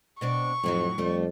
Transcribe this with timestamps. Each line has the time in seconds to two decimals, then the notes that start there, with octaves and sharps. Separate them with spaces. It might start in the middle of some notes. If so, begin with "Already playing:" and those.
0.21 B2 C4 D4 C#6
0.64 F2 A2 F#3 D#4
0.98 F2 G3 A3